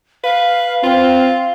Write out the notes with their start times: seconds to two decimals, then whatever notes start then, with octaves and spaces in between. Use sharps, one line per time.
0.24 B4 F5
0.83 C4 F4